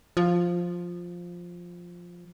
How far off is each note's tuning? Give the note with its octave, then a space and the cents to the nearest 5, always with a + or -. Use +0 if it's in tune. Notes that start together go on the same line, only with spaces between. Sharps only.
F3 +5